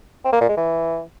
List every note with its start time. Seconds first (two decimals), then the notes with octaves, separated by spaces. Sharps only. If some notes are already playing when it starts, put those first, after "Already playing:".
0.25 C4
0.33 A#3
0.41 A#2
0.49 G#3
0.57 E3